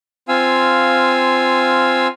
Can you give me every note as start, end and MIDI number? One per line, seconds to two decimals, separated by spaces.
0.28 2.07 60
0.28 2.07 65
0.28 2.07 77
0.28 2.07 80
0.28 2.07 88